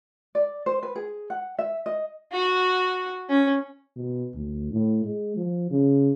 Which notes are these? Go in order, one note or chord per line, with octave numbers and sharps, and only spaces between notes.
D5
C5
B4
G#4
F#5
E5
D#5
F#4
C#4
B2
D2
A2
G#3
F3
C#3